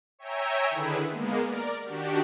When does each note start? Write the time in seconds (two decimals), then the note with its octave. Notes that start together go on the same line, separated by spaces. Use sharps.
0.19 C#5 E5 G5 G#5 A#5 E6
0.70 D3 D#3 E4 G#4 B4
1.11 G#3 A#3 B3
1.41 A#4 D5
1.84 D#3 D4 F#4 G4